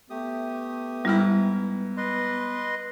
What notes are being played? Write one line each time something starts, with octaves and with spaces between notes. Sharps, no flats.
A3 B3 G4 D#6
G#2 G3 E4 F6
B4 D#5 C6